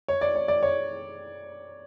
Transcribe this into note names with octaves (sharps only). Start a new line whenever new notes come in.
C#5
D5
C#5
D5
C#5